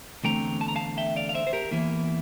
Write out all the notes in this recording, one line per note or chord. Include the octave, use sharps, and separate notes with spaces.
E2 D3 A3 C4 G5 A#5
A5
A#5
F5 A5
E5 G5
D5 F5
F5
C5 E5
C5
G4 A#4
E2 E3 A#3 E4